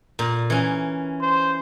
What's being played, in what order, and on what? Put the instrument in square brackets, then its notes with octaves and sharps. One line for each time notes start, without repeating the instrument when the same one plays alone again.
[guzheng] A#2
E3 C#4
[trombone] C5